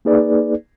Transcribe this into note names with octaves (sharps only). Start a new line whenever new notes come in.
A#3 D#4 G#4 B4 D5